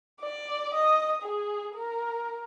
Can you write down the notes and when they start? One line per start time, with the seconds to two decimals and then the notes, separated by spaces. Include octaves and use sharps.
0.20 D5
0.74 D#5 D#6
1.22 G#4
1.75 A#4